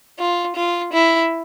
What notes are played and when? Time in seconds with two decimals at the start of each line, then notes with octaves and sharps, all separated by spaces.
0.19 F4
0.56 F4
0.93 E4